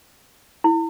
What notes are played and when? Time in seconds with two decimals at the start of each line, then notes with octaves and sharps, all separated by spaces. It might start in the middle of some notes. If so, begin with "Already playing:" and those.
0.64 E4